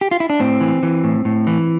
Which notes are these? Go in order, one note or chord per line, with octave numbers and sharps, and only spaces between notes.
G4
F4
E4
D4
A2 C4
E3
E3
A2
A2
E3